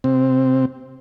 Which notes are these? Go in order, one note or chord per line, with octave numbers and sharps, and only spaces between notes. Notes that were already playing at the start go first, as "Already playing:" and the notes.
C3 C4